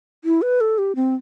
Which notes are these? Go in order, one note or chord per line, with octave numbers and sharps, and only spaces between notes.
E4
B4
A4
G4
C4